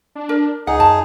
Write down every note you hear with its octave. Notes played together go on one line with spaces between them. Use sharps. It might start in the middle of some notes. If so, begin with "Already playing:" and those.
D4
A#4
C#2 D#4 G#4 F#5
F#2 A5